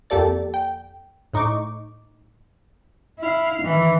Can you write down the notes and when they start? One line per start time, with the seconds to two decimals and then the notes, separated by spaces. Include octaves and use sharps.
0.10 F2 A#3 G4 A4 D5 A6
0.54 G5
1.33 A2 D#4 C#6 D6
3.19 E4 F5
3.63 D#3 E3